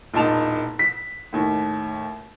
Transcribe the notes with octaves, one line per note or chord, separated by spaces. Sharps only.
E1 A#2 D#4 A5 F7
B6
D#2 A2